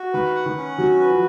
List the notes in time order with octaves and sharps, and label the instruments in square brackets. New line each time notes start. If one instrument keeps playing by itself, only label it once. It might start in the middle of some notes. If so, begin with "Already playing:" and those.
Already playing: [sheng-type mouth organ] F#4
[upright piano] D#3 [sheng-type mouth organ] B4
[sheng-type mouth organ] F#5
[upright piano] D#3
[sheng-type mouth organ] C#4
[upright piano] D#3 F#3 [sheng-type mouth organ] F#4
[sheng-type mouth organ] B4
[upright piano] F3